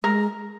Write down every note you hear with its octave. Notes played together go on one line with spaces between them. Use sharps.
G#3 A#4